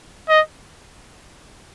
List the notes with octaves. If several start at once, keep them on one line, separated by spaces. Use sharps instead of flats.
D#5